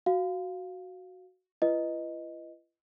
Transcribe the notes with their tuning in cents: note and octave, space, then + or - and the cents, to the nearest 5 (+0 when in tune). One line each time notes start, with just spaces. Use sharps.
F#4 +0 F5 +0
E4 +45 B4 +0 D#5 +0